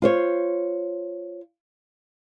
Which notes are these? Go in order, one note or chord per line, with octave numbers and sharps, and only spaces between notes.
F4 C5 C#5